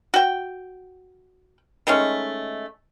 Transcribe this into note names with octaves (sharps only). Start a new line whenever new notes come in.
F#4 G5
D#3 G#3 A3 C#4